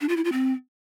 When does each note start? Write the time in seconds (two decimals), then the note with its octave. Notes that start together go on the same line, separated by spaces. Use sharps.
0.01 D4
0.09 F4
0.17 E4
0.24 F4
0.32 C4